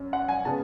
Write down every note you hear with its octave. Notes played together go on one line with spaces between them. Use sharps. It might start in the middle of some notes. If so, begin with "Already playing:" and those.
Already playing: F#2
F#5
G#5
C#3 G#3 B3 A5